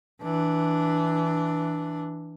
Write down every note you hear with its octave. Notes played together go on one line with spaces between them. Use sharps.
E3 D4